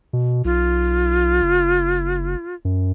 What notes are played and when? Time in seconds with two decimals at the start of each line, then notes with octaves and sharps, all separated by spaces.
0.13 B2
0.45 B1 F4
1.42 F#1
2.65 F#2